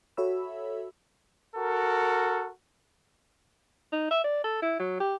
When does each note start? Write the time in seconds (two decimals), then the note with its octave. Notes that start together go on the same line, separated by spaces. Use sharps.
0.17 F#4 A4 C#5 E5 B5 E6
1.56 F#4 A4 A#4
3.92 D#4
4.11 E5
4.24 D5
4.44 A4
4.62 E4
4.79 F#3
5.00 G4